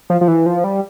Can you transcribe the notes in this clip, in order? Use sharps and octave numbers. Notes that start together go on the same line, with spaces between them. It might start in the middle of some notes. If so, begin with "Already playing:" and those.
F3
F3
E3
F3
G3